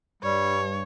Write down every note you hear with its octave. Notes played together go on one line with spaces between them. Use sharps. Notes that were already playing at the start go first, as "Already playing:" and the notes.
G2 G3 C#5